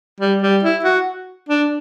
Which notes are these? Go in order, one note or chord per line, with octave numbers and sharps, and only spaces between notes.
G3
G3
E4
F#4
D4